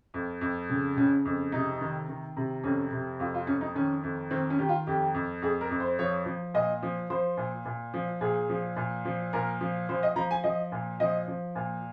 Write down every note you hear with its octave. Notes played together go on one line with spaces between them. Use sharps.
F2
F2
C#3
C#3 C#4
F2
C3 D#4
D#3
D#3
C3
F2 C#4
C3
F2 F4
F4
F2 C#4
D#4
D#3 C#4
F2
D#3 C4
C#4
D#3 G4
F4
F2 G4
F2
F2 G#4
A#4
F2
C5
F3 C#5
F3
A#2 D#5
F3
F3 C5
A#2
A#2
F3
A#2 G#4
F3
A#2
F3
A#2 A#4
F3
F3 C5
D#5
F3 A#5
G#5
F3 D#5
A#2
F3 D#5
F3
A#2